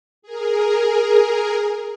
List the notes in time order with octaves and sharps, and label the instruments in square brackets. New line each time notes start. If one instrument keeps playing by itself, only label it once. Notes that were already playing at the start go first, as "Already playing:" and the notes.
[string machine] G#4 A#4